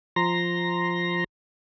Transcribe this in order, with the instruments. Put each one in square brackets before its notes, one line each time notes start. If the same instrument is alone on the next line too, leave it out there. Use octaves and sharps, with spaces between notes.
[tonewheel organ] F3 A#5 C6 A#6